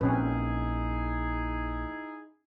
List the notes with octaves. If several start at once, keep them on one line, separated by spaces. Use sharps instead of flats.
A#1 C4 C#4 D#4 E4 G#4 B4